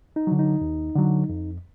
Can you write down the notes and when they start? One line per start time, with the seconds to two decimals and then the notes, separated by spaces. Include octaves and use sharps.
0.16 D#4
0.27 D3 F#3
0.39 D#4
0.61 D#2
0.95 D3 F#3
1.29 F2